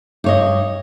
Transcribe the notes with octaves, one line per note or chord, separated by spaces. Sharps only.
G2 C#5 D#5